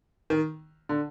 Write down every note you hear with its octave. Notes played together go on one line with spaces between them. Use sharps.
D#3
D3